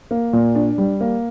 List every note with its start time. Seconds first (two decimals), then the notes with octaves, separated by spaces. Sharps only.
0.11 A#3
0.33 A#2
0.55 D4
0.78 G3
1.01 A#3